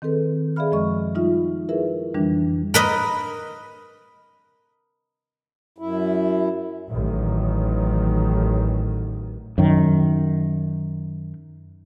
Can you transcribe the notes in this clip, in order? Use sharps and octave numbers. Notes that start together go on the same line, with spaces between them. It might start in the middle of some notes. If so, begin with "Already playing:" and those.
D#3 C4 G#4 A4 B4
G#4 D5 E5 F5 B5 F6
F#2 F3 G#3 D#5 C#6
G3 D#4 F4 E5
E4 G#4 A#4 B4 E5
F2 D3 E3 G3 D4
A#4 B4 D#5
F#2 E4
A1 D#3 F#3
F#2 D#3